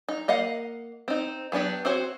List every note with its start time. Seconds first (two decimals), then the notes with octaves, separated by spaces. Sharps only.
0.08 D#4
0.28 A#3 D#5 F5 F#5
1.08 C4 D#4
1.52 F#3 B3 D4 G4
1.85 C4 F#4 C5 C#5